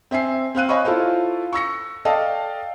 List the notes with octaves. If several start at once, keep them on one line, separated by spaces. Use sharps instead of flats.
C4 E5 G#5 C7
C4 F5 F#6 D#7
C5 C#5 D#5 G#5 B5 C#6
E4 F4 A4 C5 F5
C#6 E6 A#6 C#7
A4 D5 D#5 F5 G5 A5